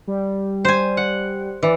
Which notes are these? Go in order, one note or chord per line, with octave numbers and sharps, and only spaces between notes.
G3
C5 G#5
F#5
E3 D5